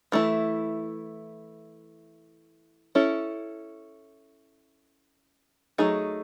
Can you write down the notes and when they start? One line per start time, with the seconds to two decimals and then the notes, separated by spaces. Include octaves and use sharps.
0.12 E3 A3 E4
2.95 C#4 E4 A4
5.78 F#3 A3 D#4 G#4